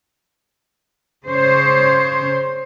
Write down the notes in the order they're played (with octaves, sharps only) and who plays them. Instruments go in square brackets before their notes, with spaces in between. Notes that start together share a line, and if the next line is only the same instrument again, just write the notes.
[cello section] C#3 C5 C#5